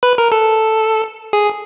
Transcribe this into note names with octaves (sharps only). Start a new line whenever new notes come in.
B4
A#4
A4
G#4